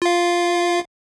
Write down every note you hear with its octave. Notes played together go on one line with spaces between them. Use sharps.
F4 F5